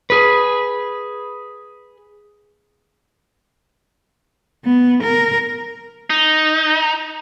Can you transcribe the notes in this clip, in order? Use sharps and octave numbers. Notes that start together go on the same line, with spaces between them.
G#4 B4
B3
A#4
D#4